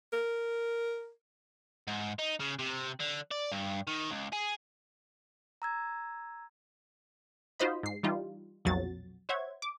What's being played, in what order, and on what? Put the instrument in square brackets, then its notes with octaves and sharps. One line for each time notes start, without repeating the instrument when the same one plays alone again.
[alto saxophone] A#4
[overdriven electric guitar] G#2
D#4
C#3
C3
D3
D5
G2
D#3
C#2
G#4
[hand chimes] A#5 E6 G#6
[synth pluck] D#4 F4 F#4 C5 D#5 B5
G#2 C7
E3 G3 D#4 F4
B1 F2 A#2 F#3 F#4 A6
C5 C#5 E5 F#5 G#6
D6